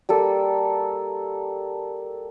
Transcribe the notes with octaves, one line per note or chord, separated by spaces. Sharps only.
G3 A#3 A4